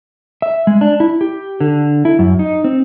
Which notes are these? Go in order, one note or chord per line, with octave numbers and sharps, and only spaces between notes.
E5
G#3
D4
E4
G4
D3
E4
F#2
D#4
C4